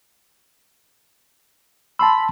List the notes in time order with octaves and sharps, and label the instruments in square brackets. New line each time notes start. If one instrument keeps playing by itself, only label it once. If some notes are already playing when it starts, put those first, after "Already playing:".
[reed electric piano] A5 C6 E6 [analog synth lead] B5